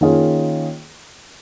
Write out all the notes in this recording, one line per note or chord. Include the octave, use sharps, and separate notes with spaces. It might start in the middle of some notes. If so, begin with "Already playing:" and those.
D#3 A#3 C#4 F4 G#4